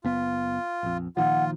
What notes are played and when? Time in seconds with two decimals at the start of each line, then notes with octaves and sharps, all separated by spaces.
0.05 F#1 B3 F4
0.83 A#1 F2
1.17 A#2 D#3 F3 F4 F#5